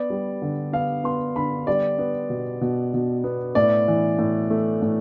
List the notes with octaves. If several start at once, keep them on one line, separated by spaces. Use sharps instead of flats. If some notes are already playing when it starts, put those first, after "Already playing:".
Already playing: B3 D5
G3
D3
B3 F5
B3 C6
D3 B5
G3 D5
B3
B2
B2
B2
B3
A2 D5
E3
A2
A3
A2